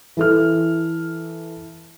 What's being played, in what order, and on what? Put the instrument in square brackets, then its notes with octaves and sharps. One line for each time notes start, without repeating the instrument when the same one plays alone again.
[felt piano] E3 A4 F6